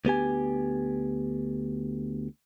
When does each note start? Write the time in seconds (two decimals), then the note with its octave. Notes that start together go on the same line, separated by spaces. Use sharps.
0.05 D2 B3 G4 G#5